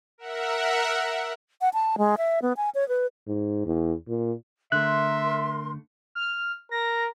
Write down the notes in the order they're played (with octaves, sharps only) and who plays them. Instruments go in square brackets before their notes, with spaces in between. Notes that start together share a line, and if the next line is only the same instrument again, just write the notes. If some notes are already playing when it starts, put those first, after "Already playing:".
[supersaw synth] A#4 E5 F#5
[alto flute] F#5
A5
G#3
E5
B3
G#5
C#5
B4
[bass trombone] G#2
E2
A#2
[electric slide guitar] D3 A3 [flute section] A#4 C6 [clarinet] E5 [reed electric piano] F#6
[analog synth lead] F6
[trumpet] A#4 [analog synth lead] A#6